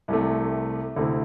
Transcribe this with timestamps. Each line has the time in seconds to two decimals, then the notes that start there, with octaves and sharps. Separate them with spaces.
0.08 C2 C3 A3
0.96 D2 C3 A3 C4 E4